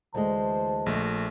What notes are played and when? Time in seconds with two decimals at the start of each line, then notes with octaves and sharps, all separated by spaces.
0.15 D2 E3 G#3 C5 A5
0.86 A#1 A3